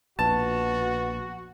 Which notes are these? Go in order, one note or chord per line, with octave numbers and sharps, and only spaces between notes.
A#1 B2 F#4 A5